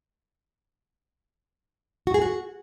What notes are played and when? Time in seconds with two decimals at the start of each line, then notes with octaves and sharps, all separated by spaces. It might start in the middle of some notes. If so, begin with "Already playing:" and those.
2.07 F#4
2.14 G#4
2.22 F#4